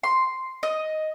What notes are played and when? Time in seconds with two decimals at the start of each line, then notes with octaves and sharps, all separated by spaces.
0.03 C6
0.63 D#5